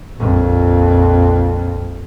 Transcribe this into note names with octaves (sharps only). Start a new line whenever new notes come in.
A#1 F2